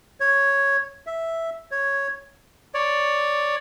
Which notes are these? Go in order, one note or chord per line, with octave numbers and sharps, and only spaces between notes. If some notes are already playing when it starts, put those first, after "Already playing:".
C#5
E5
C#5
C#5 D5